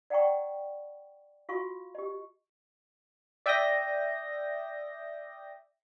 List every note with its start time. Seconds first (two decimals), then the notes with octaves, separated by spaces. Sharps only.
0.10 D5 F#5 G5 A#5 C#6
1.49 F4 F#4 F5 C#6
1.95 G4 D#5
3.46 D5 E5 G5 D#6 G6 A#6